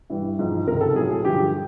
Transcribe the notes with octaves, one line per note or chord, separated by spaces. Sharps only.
G2 E3 G3
G#2 F3 G#3
C#2 C3 D#3 A#4
A4
A2 F#3 G#4
G#4
G2 D3 F3 G4